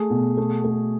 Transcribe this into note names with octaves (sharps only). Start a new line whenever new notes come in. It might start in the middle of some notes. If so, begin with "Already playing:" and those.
Already playing: A3 G#4
B2
A3
A3